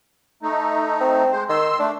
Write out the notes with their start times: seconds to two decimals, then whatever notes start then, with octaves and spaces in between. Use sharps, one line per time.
0.43 A3 D#4
1.01 C4
1.31 G#3 C5
1.49 D#3 C6 E6
1.80 A3 D4